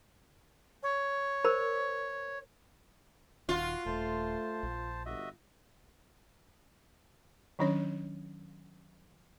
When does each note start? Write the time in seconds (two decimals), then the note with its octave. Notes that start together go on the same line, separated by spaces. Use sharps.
0.83 C#5
1.44 A#4 C5 B5
3.49 D#1 D#3 F4 F#4 F#5
3.86 D#1 A3 C5 A5
4.63 A#1
5.06 G1 F#4 D#5 E5
7.59 D#3 F#3 C#4 D4 C#5